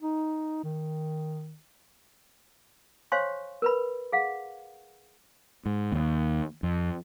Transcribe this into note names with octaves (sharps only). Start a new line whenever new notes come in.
D#4
D#3
C5 C#5 F5 G#5 C6 C#6
A#4 B4 B5
G#4 F5 F#5
G#2
D#2
F2